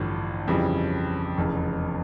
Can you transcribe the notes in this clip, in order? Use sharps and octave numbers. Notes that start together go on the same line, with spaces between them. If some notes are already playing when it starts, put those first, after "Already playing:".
Already playing: A1 G2 D3 F3
F2 C#3 E3 G3
F1 E2 C#3